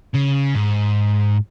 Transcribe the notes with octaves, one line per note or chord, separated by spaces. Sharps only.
C#3
G#2